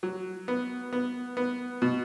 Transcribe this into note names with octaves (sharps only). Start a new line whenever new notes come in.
F#3
B3
B3
B3
B2